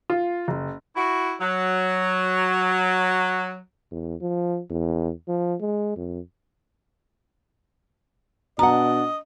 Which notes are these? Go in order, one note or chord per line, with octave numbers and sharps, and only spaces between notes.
F4
F#1
E4 F#4
F#3
E2
F3
E2
F3
G#3
F2
B2 D4 D#5 F#5 A#5